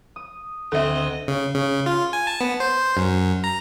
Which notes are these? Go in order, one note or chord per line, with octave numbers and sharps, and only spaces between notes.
D#6
D2 C4 A4 D#5 E5
C#3
C#3
F4
G#5
A5
B3
C5
F#2
A#5